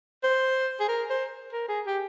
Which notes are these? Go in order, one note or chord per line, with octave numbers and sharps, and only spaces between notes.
C5
G#4
A#4
C5
A#4
G#4
G4